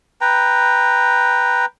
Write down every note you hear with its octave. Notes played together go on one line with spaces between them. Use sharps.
B4 G5 A#5